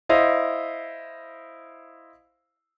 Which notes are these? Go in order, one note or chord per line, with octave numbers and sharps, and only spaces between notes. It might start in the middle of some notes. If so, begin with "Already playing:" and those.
E4 C5 D#5 F5